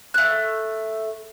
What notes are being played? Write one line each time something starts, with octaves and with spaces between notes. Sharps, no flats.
A3 F#6